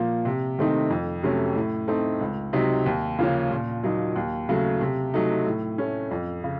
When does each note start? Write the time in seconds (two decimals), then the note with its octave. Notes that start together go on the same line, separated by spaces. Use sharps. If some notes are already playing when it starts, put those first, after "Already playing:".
Already playing: A#2 F3 A#3
0.25 C3
0.59 D#3 A3 C4 D#4
0.90 F2
1.23 C3 F#3 A3 C#4
1.55 A2
1.88 A3 C4 D#4
2.21 C#2
2.53 C3 F#3 C4 D#4
2.86 D#2
3.19 C#3 F3 A#3 C#4
3.51 A#2
3.83 F#3 A#3 D#4
4.16 D#2
4.49 C#3 F#3 A3
4.81 C3
5.14 F#3 A3 D#4
5.46 A2
5.78 A3 C#4
6.11 F2
6.44 C#3